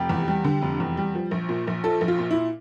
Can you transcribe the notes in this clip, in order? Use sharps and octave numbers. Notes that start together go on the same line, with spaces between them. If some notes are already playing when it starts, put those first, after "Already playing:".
Already playing: F1 G4
E2
G3
D3
F1
E2
G3
F3
A#1
A#2
A#1
F3 A4
A#1
F4
A#2
E4